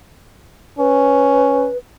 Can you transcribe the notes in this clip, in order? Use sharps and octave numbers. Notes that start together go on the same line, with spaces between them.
C#4 B4